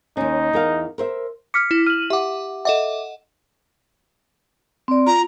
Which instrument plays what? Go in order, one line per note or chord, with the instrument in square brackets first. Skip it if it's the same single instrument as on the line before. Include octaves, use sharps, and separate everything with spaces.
[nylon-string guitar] D#2 C#4 [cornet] D#4
[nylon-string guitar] E2 A#4 F5
A#4 C5 E5
[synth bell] D6 [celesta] F6 B6 C#7
[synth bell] E4
[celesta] F6 [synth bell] D#7 F#7
[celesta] G4 D6 [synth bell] E5 F#5
[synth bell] A4 D#5 F#5 [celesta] E5 D6
[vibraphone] C4 D5
[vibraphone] F4 [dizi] A#5